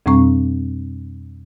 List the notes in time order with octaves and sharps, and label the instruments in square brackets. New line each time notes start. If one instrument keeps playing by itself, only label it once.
[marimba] F2 B2 G3 C4 C#6